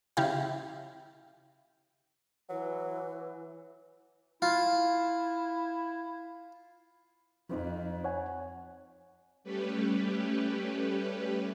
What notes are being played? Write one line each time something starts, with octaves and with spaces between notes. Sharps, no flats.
C#3 E4 G4 F5
E3 F#3 B4
E4 F4
F2 F3 C4 D#4
C#5 F#5 G#5
G3 A3 C#4 G4 B4